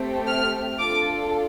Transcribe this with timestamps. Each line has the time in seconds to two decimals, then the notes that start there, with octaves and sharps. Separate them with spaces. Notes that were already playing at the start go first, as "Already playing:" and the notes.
Already playing: A3 C4 G4
0.28 F6
0.79 D4 F4 A4 D6